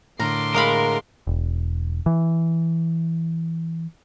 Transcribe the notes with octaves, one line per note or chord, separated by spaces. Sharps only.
A2 D3 A#4 C6 D6
G#3 A#4 F5 B5
E1
E3